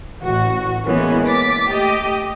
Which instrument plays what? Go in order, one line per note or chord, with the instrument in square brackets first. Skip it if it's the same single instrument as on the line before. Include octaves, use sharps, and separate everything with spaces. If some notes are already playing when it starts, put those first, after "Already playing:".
[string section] A1 F#4
E3 G#3 A#3 B3 C#4
D6 A6 B6
A3 G4 D#5